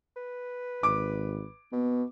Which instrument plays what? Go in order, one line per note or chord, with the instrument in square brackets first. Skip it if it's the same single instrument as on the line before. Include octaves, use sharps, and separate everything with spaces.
[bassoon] B4
[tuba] G#1 [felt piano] D6
[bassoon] B2 [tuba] B3